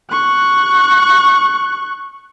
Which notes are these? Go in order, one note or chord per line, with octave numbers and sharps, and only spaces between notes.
C#6 F#6